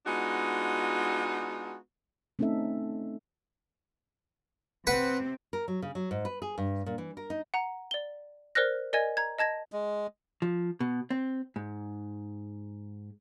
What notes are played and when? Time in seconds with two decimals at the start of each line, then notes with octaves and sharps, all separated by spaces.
0.06 G#3 B3 D4 D#4 F4 F#4
2.39 A3 C4 C#4 D#4 A4 E5
4.87 C3 C4 B4 F#5
5.53 A#4
5.68 F#3
5.82 C#3
5.95 F#3
6.11 G#2
6.25 B4
6.42 G#4
6.58 G2
6.86 A#2
6.98 E3
7.17 A#4
7.30 D#4
7.54 F#5 A#5
7.91 D5 G7
8.55 A#4 C5 D5 F6 F#6 A#6
8.93 A#4 D5 D#5 G#5 G#6
9.17 A#5 G#6
9.39 D#5 A5 G#6 A#6
9.72 G#3
10.42 F3
10.80 B2
11.10 C4
11.56 G#2